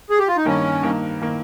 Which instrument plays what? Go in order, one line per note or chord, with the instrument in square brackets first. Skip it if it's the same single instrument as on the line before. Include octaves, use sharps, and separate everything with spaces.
[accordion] G#4
G4
F4
D#4
[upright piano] G2 D#3 A#3 [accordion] C#4
[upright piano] G2 D#3 A#3
D#3 A#3